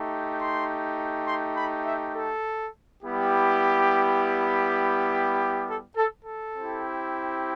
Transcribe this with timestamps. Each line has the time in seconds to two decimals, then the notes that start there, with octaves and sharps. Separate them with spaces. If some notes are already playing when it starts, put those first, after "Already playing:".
Already playing: A3 D#4 G4
0.40 C6
1.27 C6
1.57 B5
1.86 E5
2.15 A4
3.03 G3 B3 E4 G4
5.67 A4
5.96 A4
6.25 A4
6.55 C4 E4 G4